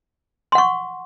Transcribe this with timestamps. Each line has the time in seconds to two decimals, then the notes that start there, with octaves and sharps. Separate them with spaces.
0.52 C6
0.55 F#5
0.58 C#6